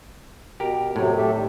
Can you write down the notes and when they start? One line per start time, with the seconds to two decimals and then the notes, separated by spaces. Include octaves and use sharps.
0.60 B2 G4 A#4
0.96 F#2 A2 C3 F#3
1.18 G4 A4 E5
1.35 D#3 G3